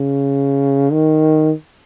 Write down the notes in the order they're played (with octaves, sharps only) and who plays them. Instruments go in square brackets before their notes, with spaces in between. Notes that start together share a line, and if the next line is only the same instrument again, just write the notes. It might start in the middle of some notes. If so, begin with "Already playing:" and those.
Already playing: [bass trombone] C#3
D#3